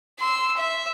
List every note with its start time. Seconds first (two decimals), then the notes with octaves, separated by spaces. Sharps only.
0.19 C6 E6
0.57 E5